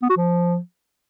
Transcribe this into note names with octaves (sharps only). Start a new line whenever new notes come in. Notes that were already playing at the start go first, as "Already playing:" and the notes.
B3
F#4
F3